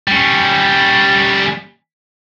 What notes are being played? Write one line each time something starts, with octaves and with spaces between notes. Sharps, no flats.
G3 C#4